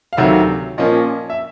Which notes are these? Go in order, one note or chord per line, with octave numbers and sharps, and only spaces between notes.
F5
D2 C3 D#3 F#3 E5
A#2 F3 A#3 C#4 D#5
E5